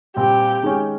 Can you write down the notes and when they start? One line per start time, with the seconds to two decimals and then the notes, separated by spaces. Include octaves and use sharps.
0.16 A#2 G3 C4 G4
0.63 D#3 G#3 C#4